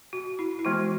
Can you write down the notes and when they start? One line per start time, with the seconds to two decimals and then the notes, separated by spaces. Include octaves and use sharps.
0.13 F#4
0.39 E4
0.59 E4
0.65 E3 G#3 B3 F#4